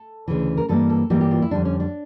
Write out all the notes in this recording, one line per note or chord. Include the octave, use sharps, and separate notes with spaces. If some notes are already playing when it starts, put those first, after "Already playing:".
Already playing: A4
D2 C#3 E3
A#4
G2 E3 G3 A#3 A4
A4
G2 E3 G3 A#3 G4
G4
F4
E4
F2 D3 G3 D4
C#4
D4